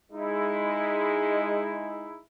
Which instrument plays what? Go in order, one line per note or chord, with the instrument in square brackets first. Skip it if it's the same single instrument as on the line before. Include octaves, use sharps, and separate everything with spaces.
[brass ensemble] G#3 D#4 E4